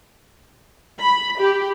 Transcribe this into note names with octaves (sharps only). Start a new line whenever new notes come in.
B5
G4